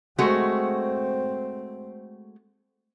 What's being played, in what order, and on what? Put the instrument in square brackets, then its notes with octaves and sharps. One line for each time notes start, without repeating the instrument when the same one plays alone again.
[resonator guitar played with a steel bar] G#3 A3 F#4 [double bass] C4